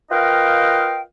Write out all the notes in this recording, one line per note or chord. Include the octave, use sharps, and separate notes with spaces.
F4 A#4 B4 D#5 F5 G5